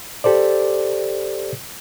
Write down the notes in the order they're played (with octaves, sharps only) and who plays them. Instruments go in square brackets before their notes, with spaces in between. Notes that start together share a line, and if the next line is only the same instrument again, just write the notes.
[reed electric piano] G4 A4 C5 D5